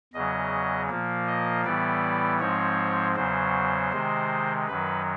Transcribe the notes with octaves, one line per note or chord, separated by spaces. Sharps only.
E2 C#3 F#3 D#5
A#2 F3 A#3
D#5
A2 E3 G3 B3 D5
G#2 F3 G#3 C4 C#5
E2 C#3 F#3 C5
C3 D#3 G#3
F#2 D#3 F#3 B4